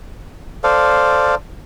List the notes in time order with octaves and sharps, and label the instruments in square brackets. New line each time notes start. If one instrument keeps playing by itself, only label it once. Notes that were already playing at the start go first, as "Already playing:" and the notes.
[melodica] A4 C5 D5 F5